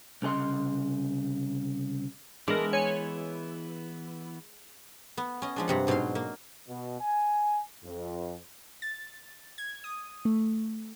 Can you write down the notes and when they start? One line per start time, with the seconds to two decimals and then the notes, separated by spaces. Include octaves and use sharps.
0.22 C2 C#3 G#4 D#5 C6
2.48 E3 G#3 B3 D4 E4 A#4
2.73 C#5 G#5
5.17 B3
5.42 C#4 D#5
5.56 F3 G#3 D4
5.68 G2 C3 F#5
5.87 G#2 B2 F#3 F5 C6
6.15 A#3
6.68 B2
7.01 G#5
7.85 F2
8.82 A6
9.58 G#6
9.84 D#6
10.25 A3